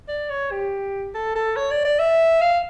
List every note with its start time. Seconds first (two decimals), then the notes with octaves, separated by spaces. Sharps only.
0.08 D5
0.30 C#5
0.51 G4
1.15 A4
1.36 A4
1.56 C#5
1.71 D5
1.85 D5
1.99 E5
2.41 F5